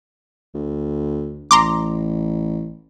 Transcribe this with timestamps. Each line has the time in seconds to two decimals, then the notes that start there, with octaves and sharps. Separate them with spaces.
0.54 D2
1.51 A1 A#5 C6 D6